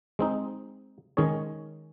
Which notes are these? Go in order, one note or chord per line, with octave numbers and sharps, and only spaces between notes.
G#3 C4 D#4
D#3 G#3 C#4 G#4 C#5